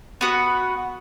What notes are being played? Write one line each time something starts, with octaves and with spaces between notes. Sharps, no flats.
B3 F#4 B4